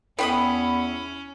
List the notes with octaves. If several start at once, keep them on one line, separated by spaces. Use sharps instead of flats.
E2 C#4 E4 A4 C5 G5 B5 D#6